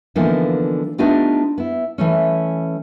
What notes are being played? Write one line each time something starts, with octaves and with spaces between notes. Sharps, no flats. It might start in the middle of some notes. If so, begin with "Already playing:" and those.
D3 E3 F3 A#3 B3 D#4
A3 B3 D4 D#4 F4 G4
B3 E4
E3 A3 C#4